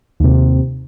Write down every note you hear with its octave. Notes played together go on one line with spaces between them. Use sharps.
D#2 C3